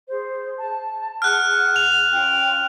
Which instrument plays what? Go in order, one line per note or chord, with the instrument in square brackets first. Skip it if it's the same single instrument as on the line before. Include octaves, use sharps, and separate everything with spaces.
[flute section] G#4 C5
A5
[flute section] G#4 F#5 [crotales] F6 F#6
[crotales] F7
[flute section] C#4 F4 G5